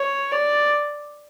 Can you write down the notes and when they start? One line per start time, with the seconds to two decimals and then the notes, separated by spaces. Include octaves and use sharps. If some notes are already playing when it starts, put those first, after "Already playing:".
Already playing: C#5
0.31 D5